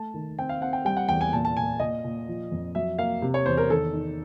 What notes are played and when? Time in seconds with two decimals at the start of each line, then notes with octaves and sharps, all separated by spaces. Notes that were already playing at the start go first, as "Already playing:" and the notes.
Already playing: A3 A5
0.14 D#3
0.39 C4 G5
0.49 F5
0.61 C4 F#5
0.73 G5
0.85 G3 G5
0.97 F#5
1.09 E2 G5
1.21 G#5
1.33 A#2 A5
1.45 A5
1.57 A#2 G#5
1.80 A#2 D#5
2.04 A#2
2.28 F3
2.52 F2
2.75 F#3 E5
2.98 A#3 F5
3.22 C3
3.34 C#5
3.46 E2 C5
3.57 A#4
3.70 D#3 A4
3.93 D#4